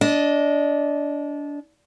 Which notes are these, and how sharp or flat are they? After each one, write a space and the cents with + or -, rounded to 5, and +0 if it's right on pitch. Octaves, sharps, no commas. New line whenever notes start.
D4 -20 D#5 +0